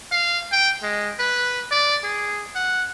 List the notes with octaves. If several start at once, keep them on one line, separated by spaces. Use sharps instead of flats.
F5
G5
G#3
B4
D5
G#4
F#5